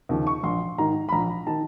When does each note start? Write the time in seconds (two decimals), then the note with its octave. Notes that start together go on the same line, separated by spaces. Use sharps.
0.09 D#2 C#3 F3
0.27 C#6
0.43 A#1 C6
0.78 G#2 D#3 A#5
1.09 B5
1.12 A#1 A#5
1.47 D#3 A5